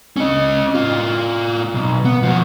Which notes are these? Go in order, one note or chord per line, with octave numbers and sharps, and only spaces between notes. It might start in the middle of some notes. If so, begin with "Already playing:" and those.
C#4 D#5
A2 F4
B1
B3
F3 F#4